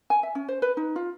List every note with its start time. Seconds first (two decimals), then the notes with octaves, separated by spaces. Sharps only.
0.10 G#5
0.23 E5
0.35 C#4
0.48 C5
0.62 B4
0.77 D#4
0.96 F4